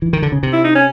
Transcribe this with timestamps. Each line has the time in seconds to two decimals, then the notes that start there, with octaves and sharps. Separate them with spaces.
0.02 E3
0.13 D#3
0.22 D3
0.32 C#3
0.43 C3
0.53 E4
0.64 D#4
0.75 C#4